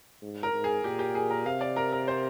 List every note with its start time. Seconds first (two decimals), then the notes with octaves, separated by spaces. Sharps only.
0.22 G#2
0.43 A#4
0.53 G#2
0.64 G#4
0.84 A#2 G4
0.99 G4
1.15 G#4
1.31 A#4
1.46 C3 F5
1.61 D5
1.76 A#4
1.92 A#4
2.08 C5